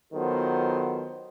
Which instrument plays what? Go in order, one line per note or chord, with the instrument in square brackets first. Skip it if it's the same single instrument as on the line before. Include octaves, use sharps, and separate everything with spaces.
[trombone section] D#3 F#3 B3 F4 A4 C5